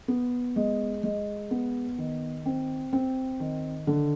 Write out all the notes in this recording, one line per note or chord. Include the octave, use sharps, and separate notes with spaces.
B3
G#3
G#3
B3
D#3
C4
C4
D#3
D3